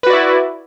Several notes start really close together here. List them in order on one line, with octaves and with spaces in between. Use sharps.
B4 F#4 D5 E4